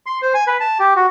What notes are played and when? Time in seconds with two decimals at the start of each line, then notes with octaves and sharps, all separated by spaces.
0.06 C6
0.22 C5
0.34 G#5
0.47 B4
0.60 A5
0.80 G4
0.96 F#4